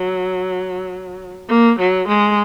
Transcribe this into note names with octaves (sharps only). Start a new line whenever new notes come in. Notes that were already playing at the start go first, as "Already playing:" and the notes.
Already playing: F#3
A#3
F#3
G#3